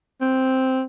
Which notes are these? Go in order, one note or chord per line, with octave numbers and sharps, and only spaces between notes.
C4